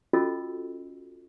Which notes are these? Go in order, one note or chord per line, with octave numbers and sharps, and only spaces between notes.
C#4 F4 F#4 A4 D#5 E6